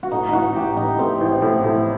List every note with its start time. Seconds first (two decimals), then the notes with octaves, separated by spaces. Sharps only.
0.03 F#4
0.11 A2 D#4
0.28 A1 D#4 F#4
0.54 A1 G4
0.77 A1 D#4
0.99 A2 C4
1.21 A1
1.42 A2
1.64 A2